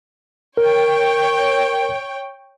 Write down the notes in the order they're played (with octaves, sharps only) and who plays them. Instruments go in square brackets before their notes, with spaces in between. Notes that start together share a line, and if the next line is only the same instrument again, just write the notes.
[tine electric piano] A#4 [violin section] C#5 G5